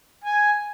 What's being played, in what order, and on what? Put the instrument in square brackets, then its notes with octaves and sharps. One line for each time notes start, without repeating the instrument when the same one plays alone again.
[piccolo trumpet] G#5